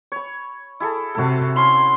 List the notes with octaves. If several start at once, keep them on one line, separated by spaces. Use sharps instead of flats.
C#5 B5
E4 G#4 A4
C3 F#4 A4
C#4 E4 C6